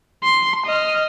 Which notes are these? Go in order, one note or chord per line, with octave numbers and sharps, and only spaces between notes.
C6
D#5 F6